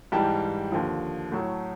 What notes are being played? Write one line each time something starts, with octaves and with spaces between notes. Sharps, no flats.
G#2 E3 G3 G5 A5
D#2 D3 F3
A2 F#3 A3